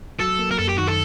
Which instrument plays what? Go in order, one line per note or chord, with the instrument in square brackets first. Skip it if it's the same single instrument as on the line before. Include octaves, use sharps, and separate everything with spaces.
[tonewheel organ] F#3 [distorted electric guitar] A4
[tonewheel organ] A#3
[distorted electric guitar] A#4
[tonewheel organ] F#2 [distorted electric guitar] A4
[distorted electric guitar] G4
[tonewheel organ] D#3 [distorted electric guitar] F#4
[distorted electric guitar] A4